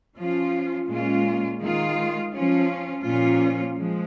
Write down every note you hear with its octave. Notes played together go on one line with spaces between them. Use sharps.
F3 C#4 F4
A#2 G#3 C#4 F4
D#3 G#3 F4
F3 C#4 F4
A#2 F3 C#4 F4
F3 G#3